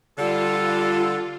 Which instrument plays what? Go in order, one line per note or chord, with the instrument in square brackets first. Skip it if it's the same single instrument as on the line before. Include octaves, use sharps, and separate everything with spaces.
[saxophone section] D3 [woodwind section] G3 A4 [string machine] F4